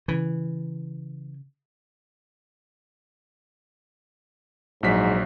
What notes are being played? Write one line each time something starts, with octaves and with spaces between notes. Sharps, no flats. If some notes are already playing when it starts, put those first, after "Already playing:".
C#3 E3
A#1 G#2 F#3 B6